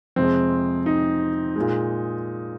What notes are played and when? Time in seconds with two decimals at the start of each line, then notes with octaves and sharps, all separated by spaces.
0.16 F2 C3 G#3 C4
0.86 D#4
1.56 A#2 G#3